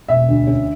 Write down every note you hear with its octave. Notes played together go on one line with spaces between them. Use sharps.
E1 E5
D2
C#4